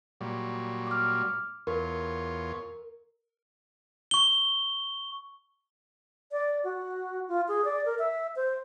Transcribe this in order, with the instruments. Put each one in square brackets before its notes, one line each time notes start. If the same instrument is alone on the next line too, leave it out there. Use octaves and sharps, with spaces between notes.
[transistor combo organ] A#2 F#3 G3
[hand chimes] D6 F6
[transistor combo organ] E2 F4 C#5 [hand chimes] A#4
[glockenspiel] C#6 G7
[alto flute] D5
F#4
F4
G#4
D5
A#4
E5
C5